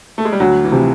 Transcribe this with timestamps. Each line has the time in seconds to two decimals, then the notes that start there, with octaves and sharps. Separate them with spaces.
0.18 A3
0.25 G#3
0.32 G3
0.40 D2 F#3
0.64 E3
0.72 C3 F3